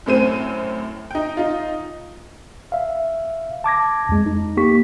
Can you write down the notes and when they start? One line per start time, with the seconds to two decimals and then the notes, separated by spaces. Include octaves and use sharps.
0.06 F#2 A2 C4 D#7
1.11 D#4 G5
1.37 D#4 F4
2.72 E5 F5
3.64 A5 D6 G#6 A#6
4.09 F2 G#3
4.26 D#4
4.57 A#3 G4 C#6 B6